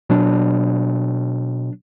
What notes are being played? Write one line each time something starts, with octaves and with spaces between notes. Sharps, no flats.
B2 F#3 D4